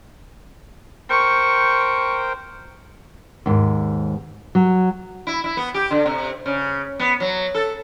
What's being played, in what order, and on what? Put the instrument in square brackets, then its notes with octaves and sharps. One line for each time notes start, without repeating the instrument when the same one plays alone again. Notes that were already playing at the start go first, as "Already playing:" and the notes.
[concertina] A#4 C5 G5 [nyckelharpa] C#6
[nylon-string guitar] D#2 G#2
F#3
[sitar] E4
E4
B3
G4
D3
C3
C#3
B3
F#3
A4